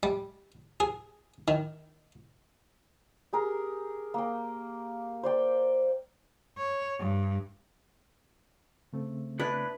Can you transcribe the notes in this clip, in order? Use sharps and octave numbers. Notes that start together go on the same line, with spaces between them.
G3
G#4
D#3
G4 G#4 A#4
A#3 G5
C5 D5 G5
C#5
G2
C#3 A3 C4
B3 D4 E4 B4